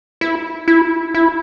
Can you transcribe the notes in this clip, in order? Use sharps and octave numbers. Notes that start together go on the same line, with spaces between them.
E4
E4
E4